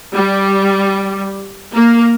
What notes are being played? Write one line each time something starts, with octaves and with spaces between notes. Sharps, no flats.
G3
A#3